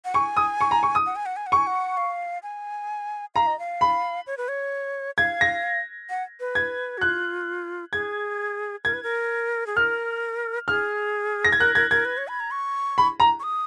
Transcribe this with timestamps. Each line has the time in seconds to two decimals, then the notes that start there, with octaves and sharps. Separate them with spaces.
0.05 F#5
0.14 G#5 C#6
0.37 D#6
0.61 C#6
0.71 A#5
0.83 C#6
0.95 D#6
1.06 F#5
1.16 G#5
1.26 F#5
1.36 G#5
1.47 F#5
1.52 G#5 C#6
1.67 F#5
1.97 F5
2.43 G#5
3.35 F5 A#5
3.47 D#5
3.59 F5
3.81 B5
4.27 C#5
4.37 B4
4.48 C#5
5.18 F5 G#6
5.41 A#6
6.10 F#5
6.40 B4
6.55 G#6
6.98 F#4
7.01 F4 F#6
7.93 G#4 G#6
8.84 A#4 G#6
8.94 B4
9.03 A#4
9.67 G#4
9.76 A#4 F6
10.68 G#4 F6
11.44 A#6
11.52 G#6
11.59 A#4 F#6
11.75 A#4 G#6
11.90 A#4 G#6
12.05 B4
12.17 C#5
12.28 B5
12.40 A#5
12.52 C#6
12.98 B5
13.20 A#5
13.40 C#6
13.43 D#6